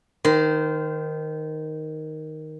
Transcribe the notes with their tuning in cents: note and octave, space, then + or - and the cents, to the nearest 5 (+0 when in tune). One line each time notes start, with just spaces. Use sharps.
D#3 +0 C5 -25